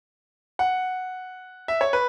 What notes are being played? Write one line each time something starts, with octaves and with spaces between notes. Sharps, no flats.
F#5
E5
C#5
B4